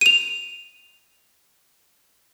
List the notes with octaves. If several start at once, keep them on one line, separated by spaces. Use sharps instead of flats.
D#7 F7